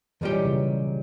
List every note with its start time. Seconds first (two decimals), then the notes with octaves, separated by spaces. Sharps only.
0.21 B1 A#2 E3 G3 C#4 G4
0.45 C#3